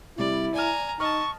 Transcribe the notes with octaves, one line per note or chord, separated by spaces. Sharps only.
C3 G3 E4 D5
D5 G#5 A#5 F6
D#4 D#5 A5 C#6 F6